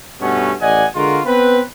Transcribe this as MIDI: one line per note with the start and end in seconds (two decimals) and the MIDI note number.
0.20 0.52 43
0.20 0.52 47
0.20 0.52 57
0.20 0.52 59
0.20 0.52 61
0.60 0.85 33
0.60 0.85 74
0.60 0.85 75
0.60 0.85 78
0.60 0.85 80
0.96 1.20 50
0.96 1.20 56
0.96 1.20 65
0.96 1.20 66
0.96 1.20 70
1.26 1.61 59
1.26 1.61 60
1.26 1.61 71